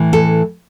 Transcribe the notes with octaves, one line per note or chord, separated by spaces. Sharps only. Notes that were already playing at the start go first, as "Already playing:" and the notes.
Already playing: A2 E3
A4